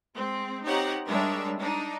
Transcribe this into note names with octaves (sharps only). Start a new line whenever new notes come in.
G#3 C4
C4 D#4 G4 C#5 F#5 A#5
G3 G#3 D4 A#4 C#5 E5
D4 D#4